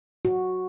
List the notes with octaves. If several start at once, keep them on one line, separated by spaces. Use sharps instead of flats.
F#4